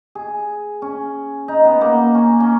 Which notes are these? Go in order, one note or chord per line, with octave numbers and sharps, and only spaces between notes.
G#4
C#4
D#4
B3
A#3
C#4
C#4